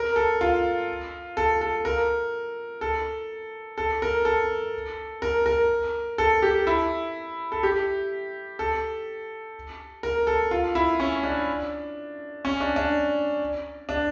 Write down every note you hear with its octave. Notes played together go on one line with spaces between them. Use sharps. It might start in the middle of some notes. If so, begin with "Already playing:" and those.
Already playing: A#4
A4
F4
A4
A4
A#4
A4
A4
A#4
A4
A#4
A#4
A4
G4
E4
A4
G4
A4
A#4
A4
F4
E4
C#4
D4
C#4
D4
D4
D4